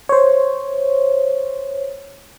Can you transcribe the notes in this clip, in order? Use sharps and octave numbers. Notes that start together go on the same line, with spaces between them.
C5 C#5